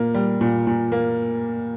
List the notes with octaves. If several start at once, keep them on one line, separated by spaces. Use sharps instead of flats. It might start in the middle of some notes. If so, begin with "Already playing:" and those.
Already playing: A#2 A#3
G3
A#2
A#2
A#3